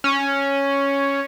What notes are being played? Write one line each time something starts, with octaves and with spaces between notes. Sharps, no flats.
C#4